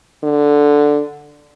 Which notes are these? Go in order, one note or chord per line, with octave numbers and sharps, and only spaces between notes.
D3